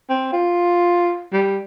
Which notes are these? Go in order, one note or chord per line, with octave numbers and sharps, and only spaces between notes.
C4
F4
G3